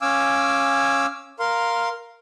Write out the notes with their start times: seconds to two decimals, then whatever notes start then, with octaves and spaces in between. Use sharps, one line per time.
0.02 C#4 F5 G#5 D6 E6
1.39 A#4 F5 C6